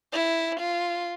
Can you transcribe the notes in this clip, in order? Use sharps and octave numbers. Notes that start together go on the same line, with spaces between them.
E4
F4